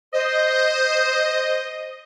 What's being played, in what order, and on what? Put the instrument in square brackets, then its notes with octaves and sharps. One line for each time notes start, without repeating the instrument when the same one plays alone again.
[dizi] C5 [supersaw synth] D#5